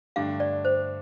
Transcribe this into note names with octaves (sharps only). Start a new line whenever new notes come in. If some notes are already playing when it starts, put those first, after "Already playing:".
G2 D3 A3 D4 G4 F5
D5
C5